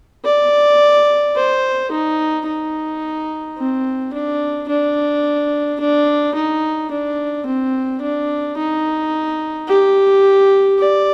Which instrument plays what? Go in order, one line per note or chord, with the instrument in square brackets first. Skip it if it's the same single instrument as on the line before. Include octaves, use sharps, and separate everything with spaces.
[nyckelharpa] D5
C5
D#4
D#4
C4
D4
D4
D4
D#4
D4
C4
D4
D#4
G4
D5